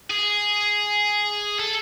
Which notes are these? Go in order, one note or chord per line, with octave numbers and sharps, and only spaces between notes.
G#4
A4